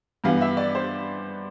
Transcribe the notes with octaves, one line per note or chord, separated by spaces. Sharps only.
G2 E3 B3 F5
E5
D5
C5